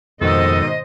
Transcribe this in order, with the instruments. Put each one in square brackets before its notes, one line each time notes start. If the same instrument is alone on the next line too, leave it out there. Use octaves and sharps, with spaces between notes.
[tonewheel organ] F2 [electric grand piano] G#2 B2 D#3 [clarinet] A4 [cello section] C5 D#5